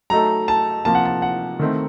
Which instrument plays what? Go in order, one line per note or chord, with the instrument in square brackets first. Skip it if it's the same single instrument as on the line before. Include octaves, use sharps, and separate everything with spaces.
[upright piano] F#3 A3 D#4 A4 [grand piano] A#5
[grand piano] A5
[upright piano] C3 F3 A#3 [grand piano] A5
[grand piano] F#5
A5
F#5
[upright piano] D#3 A3 C4 D#4